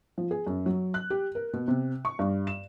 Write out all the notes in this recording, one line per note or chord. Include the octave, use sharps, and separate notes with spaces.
F3
G#4
F#2
F#3
F#6
G4
A#4
B2
C3
C#6
G2
E7